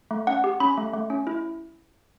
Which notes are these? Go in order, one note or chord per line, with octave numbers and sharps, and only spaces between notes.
A3
C#4 F#5
G4
C#4 B5
A3
A3
C#4
E4